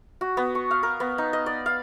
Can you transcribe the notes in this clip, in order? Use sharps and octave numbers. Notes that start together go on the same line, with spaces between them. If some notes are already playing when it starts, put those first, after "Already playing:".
F#4
B3
C#6
F5
A#4
B3
D#4
D#5
D5
F5